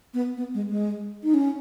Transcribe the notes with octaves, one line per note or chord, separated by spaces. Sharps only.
B3
B3
G#3
G#3
D#4
C#4